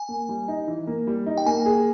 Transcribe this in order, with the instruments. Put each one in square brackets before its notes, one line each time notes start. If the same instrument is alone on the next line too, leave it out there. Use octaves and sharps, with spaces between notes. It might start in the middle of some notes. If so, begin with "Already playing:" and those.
Already playing: [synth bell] G#5
[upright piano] A#3
G3
D#4
E3
A#3
G3
D#4
[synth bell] G5
[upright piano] A#3 [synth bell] G#5
[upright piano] G#4